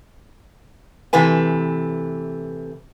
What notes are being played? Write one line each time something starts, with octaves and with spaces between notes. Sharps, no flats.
C3 E3 A3 B4 G#5